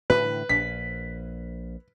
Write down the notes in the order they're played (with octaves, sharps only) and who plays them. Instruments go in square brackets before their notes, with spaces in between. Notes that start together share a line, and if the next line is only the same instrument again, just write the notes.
[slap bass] A2 D3 E3 [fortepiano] B4
[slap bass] A#1 [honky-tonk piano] B6